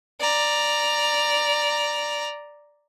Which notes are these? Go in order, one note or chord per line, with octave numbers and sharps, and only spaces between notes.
D5 A#5